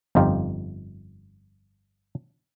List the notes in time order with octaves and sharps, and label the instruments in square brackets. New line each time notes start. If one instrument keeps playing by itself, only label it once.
[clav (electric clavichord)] G1 F2 D#4 F4 G4